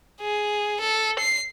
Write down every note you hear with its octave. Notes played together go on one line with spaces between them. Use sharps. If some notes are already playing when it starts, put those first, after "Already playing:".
G#4
A4
C7